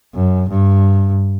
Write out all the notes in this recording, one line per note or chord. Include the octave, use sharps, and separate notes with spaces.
F#2
G2